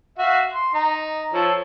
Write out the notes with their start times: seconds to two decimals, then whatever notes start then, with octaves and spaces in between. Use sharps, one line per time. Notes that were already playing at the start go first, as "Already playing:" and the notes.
0.18 F#4 E5 F5
0.53 C6
0.74 D#4 A#5
1.33 F3 A4 C#5